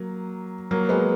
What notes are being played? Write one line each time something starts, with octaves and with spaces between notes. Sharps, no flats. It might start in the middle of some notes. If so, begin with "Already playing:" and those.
Already playing: F#3 A#3
F#3 A#3
G#3 B3